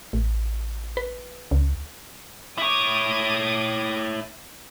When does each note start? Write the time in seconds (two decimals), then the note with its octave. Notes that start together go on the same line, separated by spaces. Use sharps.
0.13 A1
0.97 B4
1.51 C#2
2.58 E4 C#5 D6 D#6